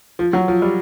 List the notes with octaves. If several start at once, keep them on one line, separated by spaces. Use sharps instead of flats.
F3
F#3
F3
G3